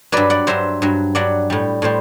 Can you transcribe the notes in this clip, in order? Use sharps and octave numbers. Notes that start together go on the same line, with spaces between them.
G2 F#3 B4 D5
D5 F#5
G2 F#3 C5 E5
G2 F#3
G2 F#3 D5 F#5
A2 G3
A2 G3 C5